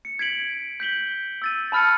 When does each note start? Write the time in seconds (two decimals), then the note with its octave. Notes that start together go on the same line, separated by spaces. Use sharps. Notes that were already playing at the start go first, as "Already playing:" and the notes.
0.05 C#7
0.19 G#6 B6 D7 F#7
0.80 G6 B6 F#7 G7
1.42 E6 A6 D#7
1.72 A5 B5 F6 A6 C#7